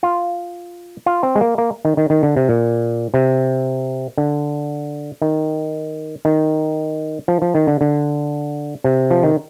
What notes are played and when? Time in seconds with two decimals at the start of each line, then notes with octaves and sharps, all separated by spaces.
0.03 F4
1.06 F4
1.23 C4
1.35 G#3
1.41 A#3
1.58 A#3
1.85 D#3
1.97 D#3
2.10 D#3
2.23 D3
2.37 C3
2.49 A#2
3.14 C3
4.18 D3
5.22 D#3
6.25 D#3
7.28 F3
7.42 F3
7.55 D#3
7.67 D3
7.81 D3
8.84 C3
9.11 F3
9.23 D#3